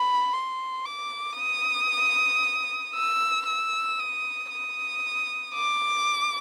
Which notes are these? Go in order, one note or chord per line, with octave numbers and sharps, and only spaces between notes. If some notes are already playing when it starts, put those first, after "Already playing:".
Already playing: B5
C6
D6
D#6
E6
E6
D#6
D#6
D6